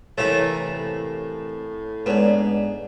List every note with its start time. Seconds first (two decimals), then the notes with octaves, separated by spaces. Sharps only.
0.18 C3 E3 A3 A#3 E4 C#5 F5
0.73 A2
2.06 G#2 B3 D4 B4 C#5 D5